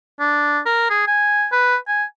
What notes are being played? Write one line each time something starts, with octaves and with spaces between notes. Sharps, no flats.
D4
A#4
G#4
G#5
B4
G#5